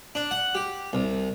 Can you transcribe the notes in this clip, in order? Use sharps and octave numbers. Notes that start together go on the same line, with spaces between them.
D4
F#5
G4
C2